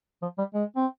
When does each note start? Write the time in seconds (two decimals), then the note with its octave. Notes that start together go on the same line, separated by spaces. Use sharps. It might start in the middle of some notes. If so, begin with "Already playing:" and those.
0.22 F3
0.38 G3
0.54 G#3
0.76 C4